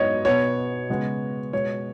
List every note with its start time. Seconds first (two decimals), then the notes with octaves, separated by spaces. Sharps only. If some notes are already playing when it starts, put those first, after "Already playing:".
Already playing: G#2 F#3 B3 C#5 D#5
0.25 B2 B3 C#5
0.89 C#3 G#3 B3
1.53 B2 G#3 B3 C#5